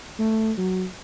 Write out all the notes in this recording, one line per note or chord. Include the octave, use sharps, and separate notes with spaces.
A3
F#3